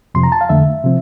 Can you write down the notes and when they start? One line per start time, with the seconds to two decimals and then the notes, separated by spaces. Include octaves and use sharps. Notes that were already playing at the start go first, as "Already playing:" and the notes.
0.15 F2 C3 F3 C6
0.23 A#5
0.32 A5
0.41 F5
0.49 F2 D3 A3 E5
0.84 C3 F3 C4